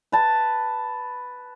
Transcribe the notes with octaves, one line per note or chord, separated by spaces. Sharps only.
B4 A5